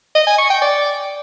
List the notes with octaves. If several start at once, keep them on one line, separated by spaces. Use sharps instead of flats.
D#5
G#5
C#6
G5
D5